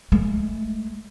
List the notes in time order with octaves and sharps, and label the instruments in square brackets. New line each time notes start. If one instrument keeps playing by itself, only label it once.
[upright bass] G#3 A3